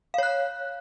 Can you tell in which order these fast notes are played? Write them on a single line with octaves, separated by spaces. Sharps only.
F5 C#5 F#6